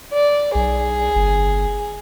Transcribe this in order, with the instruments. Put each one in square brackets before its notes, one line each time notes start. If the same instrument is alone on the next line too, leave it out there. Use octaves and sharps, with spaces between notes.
[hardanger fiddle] D5
[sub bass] B1 [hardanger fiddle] G#4
[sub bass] G1